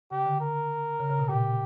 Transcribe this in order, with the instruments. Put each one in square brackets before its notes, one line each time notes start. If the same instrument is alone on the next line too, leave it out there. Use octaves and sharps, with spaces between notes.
[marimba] C#3 [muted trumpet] G4
[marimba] D3
[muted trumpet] A#4
[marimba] C#3
C#3
B2
[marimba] A#2 [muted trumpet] G4